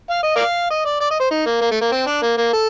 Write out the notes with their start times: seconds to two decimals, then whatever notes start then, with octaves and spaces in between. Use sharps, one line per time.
0.10 F5
0.23 D#5
0.36 A#4 D5 F5
0.70 D#5
0.85 D5
1.01 D5
1.11 D#5
1.20 C5
1.31 D#4
1.46 A#3
1.61 A#3
1.72 A3
1.81 A#3
1.92 C4
2.07 D4
2.22 A#3
2.37 A#3
2.53 A4